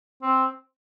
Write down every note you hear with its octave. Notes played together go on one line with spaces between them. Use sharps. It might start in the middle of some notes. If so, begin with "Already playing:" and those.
C4